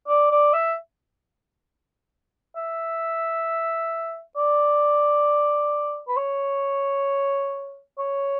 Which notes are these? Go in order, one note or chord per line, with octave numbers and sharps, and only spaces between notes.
D5
D5
E5
E5
D5
B4
C#5
C#5